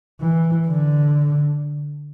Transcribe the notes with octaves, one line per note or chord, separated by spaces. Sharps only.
E3
D3